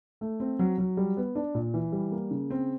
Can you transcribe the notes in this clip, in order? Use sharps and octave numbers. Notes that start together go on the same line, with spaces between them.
A3
C4
F#3
F#3
G3
B3
D4
A#2
E3
G3
A#3
C#3
C4